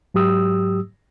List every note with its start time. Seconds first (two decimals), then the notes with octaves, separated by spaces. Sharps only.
0.14 G#2 F#3 G4 D#6 E6